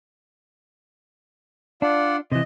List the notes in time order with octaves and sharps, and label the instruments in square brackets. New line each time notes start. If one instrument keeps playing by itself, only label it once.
[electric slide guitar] D4 [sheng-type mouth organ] F4 D5 F#5
[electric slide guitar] C3 E3 [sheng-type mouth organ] D#5